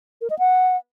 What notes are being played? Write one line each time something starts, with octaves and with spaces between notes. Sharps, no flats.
A#4
D#5
F#5